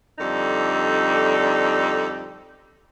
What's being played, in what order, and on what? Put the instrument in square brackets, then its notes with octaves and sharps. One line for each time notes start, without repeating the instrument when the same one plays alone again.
[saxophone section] F2 D3 G3 D#4 A4